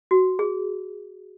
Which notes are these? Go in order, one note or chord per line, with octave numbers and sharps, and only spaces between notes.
F#4
G#4